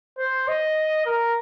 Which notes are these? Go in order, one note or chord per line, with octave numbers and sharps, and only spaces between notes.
C5
D#5
A#4